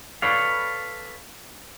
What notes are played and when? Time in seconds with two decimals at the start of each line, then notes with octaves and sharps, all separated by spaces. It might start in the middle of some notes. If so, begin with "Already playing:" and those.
0.22 A4 B4 C#5 D5 F5